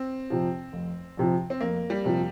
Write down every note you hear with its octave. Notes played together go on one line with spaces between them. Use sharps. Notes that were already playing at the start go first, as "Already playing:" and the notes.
Already playing: C4
F2 C3 F3
F1
F2 C3 F3
C4
F1 A#3
G3
F2 C3 F3